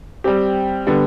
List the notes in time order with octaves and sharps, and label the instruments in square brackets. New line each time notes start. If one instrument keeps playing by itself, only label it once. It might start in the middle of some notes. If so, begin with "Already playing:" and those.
[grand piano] G3 C4 G4
D3 G3 B3